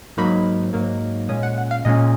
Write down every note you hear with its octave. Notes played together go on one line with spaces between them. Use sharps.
G#2 F#3 A#3 D#4 B5
G#2 F#3 A#3 D#4
A#2 G#3 C#4 D#6
F#5
F#5
F5
A#2 G#3 C#4 D#5